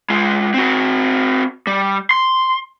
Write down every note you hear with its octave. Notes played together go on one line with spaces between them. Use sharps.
G#3 F4
C4 F#4
G3
C6